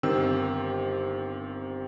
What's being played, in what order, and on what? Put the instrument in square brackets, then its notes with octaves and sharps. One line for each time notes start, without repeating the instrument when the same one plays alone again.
[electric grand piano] G1 D#3 C4 G4 E6